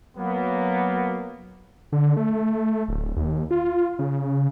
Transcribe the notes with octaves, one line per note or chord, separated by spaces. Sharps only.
F#3 A#3 B3
D3
A3
D1
D#2
F4
C#3